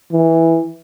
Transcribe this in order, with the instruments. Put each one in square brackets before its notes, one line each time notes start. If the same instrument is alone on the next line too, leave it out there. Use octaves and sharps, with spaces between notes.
[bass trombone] E3